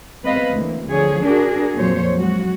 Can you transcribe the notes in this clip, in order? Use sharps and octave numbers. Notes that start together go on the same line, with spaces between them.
G#3 B3 C4 B4 D#5 F5
D2 E3 A#3
D3 F3 G#4 C#5
D4 F#4 G#4 A#4
F2 A#2 F3 F#3 C5 C#5
F#3 G#3 F#4